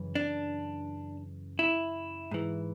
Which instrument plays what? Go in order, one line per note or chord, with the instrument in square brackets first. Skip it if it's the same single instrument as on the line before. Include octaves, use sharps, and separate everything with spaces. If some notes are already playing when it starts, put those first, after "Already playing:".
Already playing: [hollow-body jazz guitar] F#2 C#3 E3
D4
E4
G#2 E3